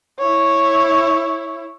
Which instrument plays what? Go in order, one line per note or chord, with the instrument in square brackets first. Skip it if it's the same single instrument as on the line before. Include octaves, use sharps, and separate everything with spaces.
[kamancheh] E4 C#5